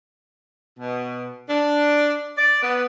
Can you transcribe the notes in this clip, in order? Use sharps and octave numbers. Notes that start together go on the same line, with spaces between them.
B2
D4
D5
B3